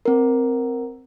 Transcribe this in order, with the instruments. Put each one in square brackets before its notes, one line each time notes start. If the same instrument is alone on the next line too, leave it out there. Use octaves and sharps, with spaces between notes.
[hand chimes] C4 A#4